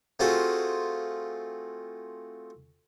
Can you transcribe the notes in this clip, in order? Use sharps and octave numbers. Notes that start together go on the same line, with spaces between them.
A3 C4 F4 F#4 G#4